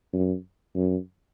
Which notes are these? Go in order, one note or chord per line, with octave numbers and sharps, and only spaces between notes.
F#2
F#2